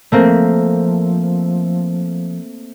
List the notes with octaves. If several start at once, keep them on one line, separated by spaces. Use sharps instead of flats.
F3 A3 A#3 C4